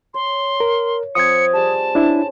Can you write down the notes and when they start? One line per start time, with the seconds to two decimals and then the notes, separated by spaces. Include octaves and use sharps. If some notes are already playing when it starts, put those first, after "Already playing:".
0.14 C#5 C6
0.60 A#4
1.15 F3 C4 D#6 G#6 C#7
1.53 G3 G4 G#4 A5
1.95 C#4 D4 E4